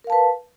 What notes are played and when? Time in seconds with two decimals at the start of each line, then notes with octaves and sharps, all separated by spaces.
0.04 A#4
0.07 F5
0.10 A5
0.12 B4